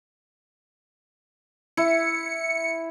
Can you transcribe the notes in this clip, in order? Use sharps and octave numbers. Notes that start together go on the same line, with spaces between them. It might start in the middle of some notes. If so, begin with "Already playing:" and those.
E4 C#7